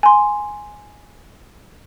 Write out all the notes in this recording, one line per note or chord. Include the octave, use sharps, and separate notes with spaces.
G#5 C6